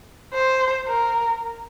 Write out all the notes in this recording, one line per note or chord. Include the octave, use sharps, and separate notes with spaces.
C5
A#4